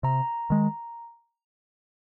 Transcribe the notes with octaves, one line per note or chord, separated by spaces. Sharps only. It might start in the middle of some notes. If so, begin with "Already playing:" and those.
C3 A#5
D#3 G#3